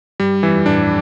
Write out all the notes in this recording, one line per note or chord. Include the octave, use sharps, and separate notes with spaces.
G2 G3
F2 E3
A2 D4